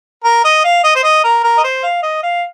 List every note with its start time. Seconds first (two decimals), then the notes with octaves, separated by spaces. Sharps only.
0.24 A#4
0.44 D#5
0.64 F5
0.84 D#5
0.96 C5
1.03 D#5
1.24 A#4
1.44 A#4
1.58 D#5
1.64 C5
1.83 F5
2.03 D#5
2.23 F5